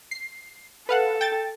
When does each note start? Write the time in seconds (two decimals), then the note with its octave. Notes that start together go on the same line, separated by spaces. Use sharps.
0.11 C7
0.89 A4 B4 F5 F#5
1.21 G5 A6